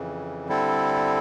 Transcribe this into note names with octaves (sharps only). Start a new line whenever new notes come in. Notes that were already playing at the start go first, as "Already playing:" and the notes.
Already playing: F2 C#3 E3
D3 G3 C4 E4 A4